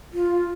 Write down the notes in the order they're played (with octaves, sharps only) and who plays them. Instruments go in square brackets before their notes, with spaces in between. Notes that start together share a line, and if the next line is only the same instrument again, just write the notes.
[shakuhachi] F4